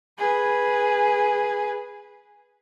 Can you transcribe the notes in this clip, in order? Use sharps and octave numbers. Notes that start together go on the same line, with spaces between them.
G#4 B4